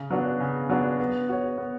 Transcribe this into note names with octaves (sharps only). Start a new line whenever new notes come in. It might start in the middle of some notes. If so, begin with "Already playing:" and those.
Already playing: C#3
F#3 B3 D4 F#4
C#3
F#3 B3 D4 F#4
B3
F#4 C#5
B3